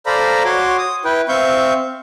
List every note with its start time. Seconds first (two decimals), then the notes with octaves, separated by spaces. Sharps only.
0.06 A4 C5 D5 F5 A#5 B5
0.45 F#4 C#5 C6 D6
0.78 D#6
1.05 E4 B4 G5
1.29 C4 E5 F5 C#6 G6